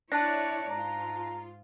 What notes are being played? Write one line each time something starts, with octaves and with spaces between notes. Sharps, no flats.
D4 E4 C#5 D5 A5 F#6 A#6
G#2 F4 A#5